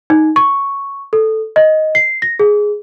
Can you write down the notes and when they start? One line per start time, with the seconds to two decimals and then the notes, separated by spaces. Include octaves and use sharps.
0.10 D#4
0.36 C#6
1.13 A4
1.56 D#5
1.95 C7
2.22 A#6
2.39 G#4